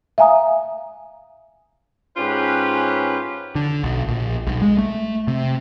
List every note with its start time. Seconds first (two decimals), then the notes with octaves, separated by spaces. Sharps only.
0.18 E5 F5 G#5 A#5 D#6
2.17 G#2 C#4 F4 G4 B4
3.55 D3
3.84 B1
4.07 A#1
4.47 B1
4.62 G#3
4.78 A3
5.27 C3